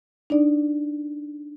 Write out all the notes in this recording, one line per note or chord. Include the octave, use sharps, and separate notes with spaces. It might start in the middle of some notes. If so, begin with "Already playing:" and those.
D4 D#4 D5